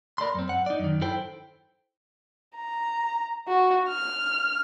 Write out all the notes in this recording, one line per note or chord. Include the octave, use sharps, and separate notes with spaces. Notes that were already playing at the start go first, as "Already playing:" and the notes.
A#4 D5 B5 C6
F#2 C4
F#5
D#4 D5
F#2 D#3
E4 A4 C5 G5
A#5
F#4
F6